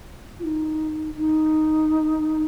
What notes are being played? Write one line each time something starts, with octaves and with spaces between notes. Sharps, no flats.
F4
D#4
D#4